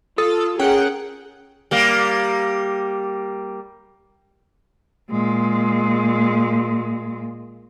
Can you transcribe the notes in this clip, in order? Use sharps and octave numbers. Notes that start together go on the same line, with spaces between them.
F4 A4 D#6
C#4 G#4 A#4 F#5 G5
G3 A#3
A#2 G#3